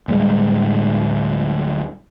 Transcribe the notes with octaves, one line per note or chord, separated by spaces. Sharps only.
D1 A2 G3 G#3